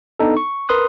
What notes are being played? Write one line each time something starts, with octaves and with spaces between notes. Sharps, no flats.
B3 D4 D#4 A4
C#6
A#4 B4 C6 D#6 F#6